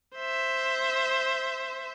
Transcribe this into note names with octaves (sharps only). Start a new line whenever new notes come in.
C5 E5